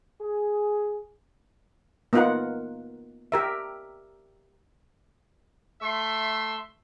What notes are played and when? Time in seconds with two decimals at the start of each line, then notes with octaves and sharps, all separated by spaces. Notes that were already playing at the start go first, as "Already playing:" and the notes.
0.21 G#4
2.13 A#3 B3 D#4 F4 A#4 F#5
3.32 G4 A#4 E5
5.82 A3 E5 C6